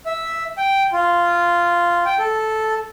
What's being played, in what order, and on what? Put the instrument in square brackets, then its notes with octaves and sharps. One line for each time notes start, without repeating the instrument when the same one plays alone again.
[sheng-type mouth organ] E5
G5
F4
G5
A4